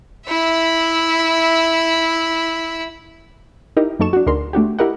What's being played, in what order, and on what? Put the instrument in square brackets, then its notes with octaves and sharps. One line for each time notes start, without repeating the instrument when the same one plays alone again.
[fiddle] E4 E5
[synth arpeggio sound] D#4 E4 G4 A#4 D#5
F#2 A#3 D#4 A4 C#6 E7
D4 F#4
D2 D4 D#4 G#4 A#4 C6
A3 D4 F#4 G4
E4 G4 A#4 D#5 F#5